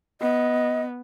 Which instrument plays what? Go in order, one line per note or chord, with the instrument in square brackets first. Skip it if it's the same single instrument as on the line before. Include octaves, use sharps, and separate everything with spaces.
[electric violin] B3 [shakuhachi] D#5